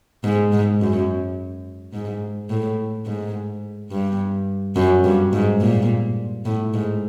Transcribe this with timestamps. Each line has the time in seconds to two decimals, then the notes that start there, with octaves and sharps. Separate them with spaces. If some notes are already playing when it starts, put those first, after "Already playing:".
0.24 G#2
0.52 G#2
0.81 F#2
1.93 G#2
2.50 A2
3.06 G#2
3.91 G2
4.76 F#2
5.04 G2
5.33 G#2
5.61 A#2
6.45 A2
6.74 G#2